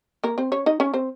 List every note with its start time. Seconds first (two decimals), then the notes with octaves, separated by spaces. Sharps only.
0.24 A#3 A#4
0.38 C4 C5
0.52 C#4 C#5
0.66 D#4 D#5
0.80 C#4 C#5
0.94 C4 C5